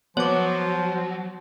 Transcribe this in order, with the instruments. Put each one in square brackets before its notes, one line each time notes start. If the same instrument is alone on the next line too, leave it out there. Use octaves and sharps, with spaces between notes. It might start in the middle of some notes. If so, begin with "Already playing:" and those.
[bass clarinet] F3 [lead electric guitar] F#3 [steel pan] B3 [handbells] C#5 D6